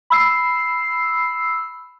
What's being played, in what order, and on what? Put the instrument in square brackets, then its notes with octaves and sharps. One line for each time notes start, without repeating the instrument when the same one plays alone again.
[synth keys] B5 E6 C7